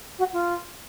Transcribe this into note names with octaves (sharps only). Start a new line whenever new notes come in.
F#4
F4